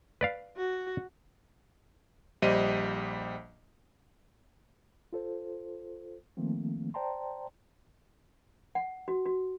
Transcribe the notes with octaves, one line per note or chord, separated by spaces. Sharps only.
B4 D5 F5
F#4
A#1 G3 C5 D#5 D#7
F4 A4 C5
D#3 F3 A3 A#3 C4
C5 D5 G5 A5 A#5 C6
F#5
F#4
F#4